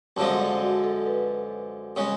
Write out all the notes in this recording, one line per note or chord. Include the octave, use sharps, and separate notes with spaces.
F#2 D3 F3 G#3 A5
D5
F#4
A4
B4
C#3 G#3